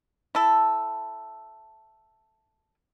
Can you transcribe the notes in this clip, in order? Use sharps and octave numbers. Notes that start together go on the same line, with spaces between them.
E4 A4